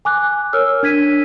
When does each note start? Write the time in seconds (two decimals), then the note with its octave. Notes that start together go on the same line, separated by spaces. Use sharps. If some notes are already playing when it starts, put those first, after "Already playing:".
0.05 G#5 D6 F#6
0.53 A#4 C#5 E6 F6
0.83 D4 G#6 B6 D#7